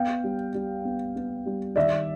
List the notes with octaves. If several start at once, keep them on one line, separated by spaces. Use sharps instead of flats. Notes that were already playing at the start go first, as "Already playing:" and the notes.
Already playing: B3 F5 G5
G3
G3
B3
B3
G3
D#3 D5 E5